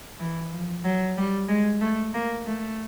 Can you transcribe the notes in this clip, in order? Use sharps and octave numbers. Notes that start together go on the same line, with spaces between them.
E3
F3
F#3
G3
G#3
A3
A#3
A3